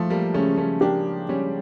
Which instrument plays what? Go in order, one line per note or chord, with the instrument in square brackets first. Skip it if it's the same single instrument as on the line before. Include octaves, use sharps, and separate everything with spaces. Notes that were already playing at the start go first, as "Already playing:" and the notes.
Already playing: [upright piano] F3 [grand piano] A3
[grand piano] G3 A#3
[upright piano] C#3 [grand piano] A3 C#4
[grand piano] A3 C#4
[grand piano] A#3 D4 [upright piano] G4
[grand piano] G3 [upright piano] C#4